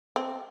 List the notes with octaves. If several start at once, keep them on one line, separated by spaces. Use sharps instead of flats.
C4